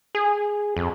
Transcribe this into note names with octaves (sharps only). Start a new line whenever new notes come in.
G#4
F2